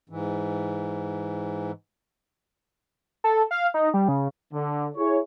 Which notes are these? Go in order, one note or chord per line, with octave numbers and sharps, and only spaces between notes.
G#2 E3
A4
F5
D#4
G3
C#3
D3
E4 G#4 C#5